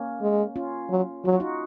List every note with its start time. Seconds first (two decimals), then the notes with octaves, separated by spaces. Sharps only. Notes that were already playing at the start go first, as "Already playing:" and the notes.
Already playing: A#3 C#4
0.21 G#3
0.56 C#4 F4
0.90 F#3
1.25 F#3 F#4
1.33 F4
1.40 D#4 F#4